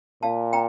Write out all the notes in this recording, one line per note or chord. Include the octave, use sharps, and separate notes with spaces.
A#2 F5 A5
G5 A#5